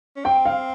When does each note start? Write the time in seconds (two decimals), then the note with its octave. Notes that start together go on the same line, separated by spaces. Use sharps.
0.16 C#4
0.24 C4 G5
0.45 F5